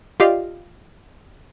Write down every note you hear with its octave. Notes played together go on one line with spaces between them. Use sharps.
F4 G4 D5 D#5 F5